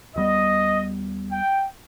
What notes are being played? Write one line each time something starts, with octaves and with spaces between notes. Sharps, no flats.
D#2 D#3 G3 B3 D#5
G5